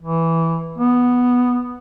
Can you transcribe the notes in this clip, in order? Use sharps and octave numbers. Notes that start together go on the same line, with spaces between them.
E3
B3